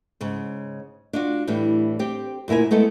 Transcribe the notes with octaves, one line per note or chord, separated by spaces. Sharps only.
G#2 C#3
D4 F4 F#4
A2 E3 G3
C4 G4
D2 A#2 E4 A#4 G#5
G#3 A3 B3 E4 A4